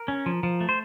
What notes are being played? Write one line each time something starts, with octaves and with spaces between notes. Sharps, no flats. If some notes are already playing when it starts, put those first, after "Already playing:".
Already playing: A#4
C#4
F3
F3
A3
C5